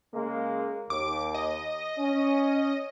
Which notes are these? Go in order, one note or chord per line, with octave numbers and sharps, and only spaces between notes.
C#3 G#3 A#3
D#2 D6
D#5
C#4